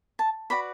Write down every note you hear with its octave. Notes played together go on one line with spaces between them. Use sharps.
A5
F#4 B4 D5 B5